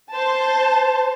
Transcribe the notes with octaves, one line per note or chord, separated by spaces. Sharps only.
C5 A5